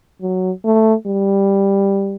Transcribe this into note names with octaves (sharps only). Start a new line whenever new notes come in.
F#3
A3
G3